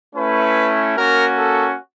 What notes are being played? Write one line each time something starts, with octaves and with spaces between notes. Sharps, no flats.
A3 C#4 E4 B4
A#3 C#4 F#4 A#4
A4